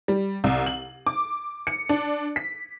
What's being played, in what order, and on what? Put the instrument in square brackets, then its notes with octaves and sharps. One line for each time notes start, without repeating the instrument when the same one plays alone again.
[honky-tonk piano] G3
C2
F#7
D6
C#7
D4
B6